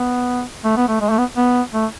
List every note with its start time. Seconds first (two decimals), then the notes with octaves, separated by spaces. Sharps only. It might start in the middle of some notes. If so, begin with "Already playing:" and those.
Already playing: B3
0.64 A3
0.76 B3
0.88 A3
1.01 G#3
1.10 A3
1.18 B3
1.36 B3
1.73 A3